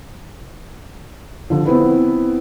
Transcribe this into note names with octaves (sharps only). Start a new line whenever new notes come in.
D3 F3
B3 C4 E4 B4